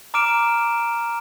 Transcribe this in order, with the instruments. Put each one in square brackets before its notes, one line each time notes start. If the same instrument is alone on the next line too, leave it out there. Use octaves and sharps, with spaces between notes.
[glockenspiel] A#5 D6 F6 D7 E7